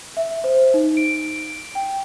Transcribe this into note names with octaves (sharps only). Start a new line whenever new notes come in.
E5
C5
D#4
D7
G5